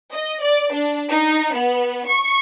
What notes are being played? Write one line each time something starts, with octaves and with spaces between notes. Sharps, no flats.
D#5
D5
D4
D#4
B3
C#6